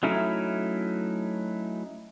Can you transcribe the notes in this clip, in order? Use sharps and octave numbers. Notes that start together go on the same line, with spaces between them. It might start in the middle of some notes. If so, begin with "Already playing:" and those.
F#3 A3 C#4 D#4 E4